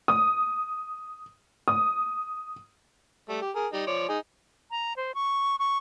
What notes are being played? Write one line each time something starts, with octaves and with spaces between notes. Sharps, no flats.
D#6
D#6
G3 A3
G4
G#4 A#4
G3 D#4 D#5
F3 C#5 D5
D#4 G#4
A#5
C5
C#6
C#6